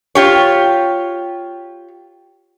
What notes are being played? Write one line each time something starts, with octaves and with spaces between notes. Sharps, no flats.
F4 G4 C#5